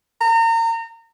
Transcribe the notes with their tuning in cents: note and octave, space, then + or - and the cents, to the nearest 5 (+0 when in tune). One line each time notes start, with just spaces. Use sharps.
A#5 -35